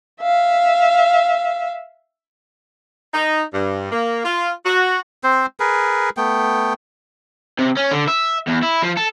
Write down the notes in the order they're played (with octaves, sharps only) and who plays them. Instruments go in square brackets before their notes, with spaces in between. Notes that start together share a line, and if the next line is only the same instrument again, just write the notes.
[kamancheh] E5 F5
[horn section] D#4
G2
A#3
F4
F#4
[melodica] C4 C5
G#4 A#4 B4
A3 B3 G5
[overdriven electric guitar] C3
C#4
D3
E5
E2
E4
F3
A4